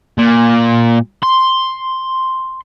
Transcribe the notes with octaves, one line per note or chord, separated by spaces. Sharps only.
A#2
C6